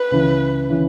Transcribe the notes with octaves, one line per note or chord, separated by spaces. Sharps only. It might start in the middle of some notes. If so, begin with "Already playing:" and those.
Already playing: B4
C#2 C#3 E3
C#3 E3